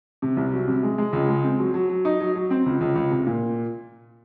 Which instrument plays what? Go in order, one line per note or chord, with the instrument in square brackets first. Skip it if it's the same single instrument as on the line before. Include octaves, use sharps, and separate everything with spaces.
[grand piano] C3
C2
F#3
C3
G#3
G#3
C#2
G#3
C4
F#3
F#3
F#3
D#4
F#3
F#3
C4
C#2
C#2
C#2
C3
A#2